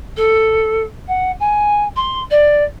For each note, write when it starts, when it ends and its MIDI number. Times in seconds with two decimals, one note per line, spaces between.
0.16 0.82 69
1.07 1.31 78
1.40 1.84 80
1.96 2.19 84
2.30 2.63 74